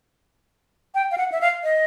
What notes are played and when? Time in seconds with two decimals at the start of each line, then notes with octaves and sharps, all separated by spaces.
0.95 G5
1.11 F5
1.18 F#5
1.32 E5
1.41 F5
1.64 D#5